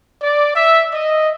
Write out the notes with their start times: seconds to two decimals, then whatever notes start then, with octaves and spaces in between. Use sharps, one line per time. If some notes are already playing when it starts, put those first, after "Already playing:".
0.22 D5
0.56 E5
0.92 D#5